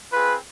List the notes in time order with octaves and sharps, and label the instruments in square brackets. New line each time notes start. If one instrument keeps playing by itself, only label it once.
[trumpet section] C4 F4 G#4 B4